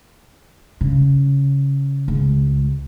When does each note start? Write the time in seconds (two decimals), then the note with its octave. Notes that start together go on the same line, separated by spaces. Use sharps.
0.81 C#3
2.08 C#2